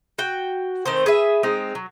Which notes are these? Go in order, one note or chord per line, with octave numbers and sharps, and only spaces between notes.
F#4 G5
D#3 A3 C4 C5
G#4 B4 E5
G#3 C4 D#4
F#3